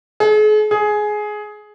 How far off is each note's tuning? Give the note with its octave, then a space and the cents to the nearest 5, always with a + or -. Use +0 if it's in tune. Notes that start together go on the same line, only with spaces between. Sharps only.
G#4 +45
G#4 +15